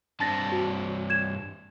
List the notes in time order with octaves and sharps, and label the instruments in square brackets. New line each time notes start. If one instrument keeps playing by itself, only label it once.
[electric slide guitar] G2 C4 A5 [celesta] D4 A6 A#6
[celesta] F#4
G#6 E7